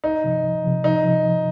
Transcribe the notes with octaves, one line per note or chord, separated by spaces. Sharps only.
C2 D#4
C3 F3
C2
C3 F3
C2 D#4
C3 F3
C2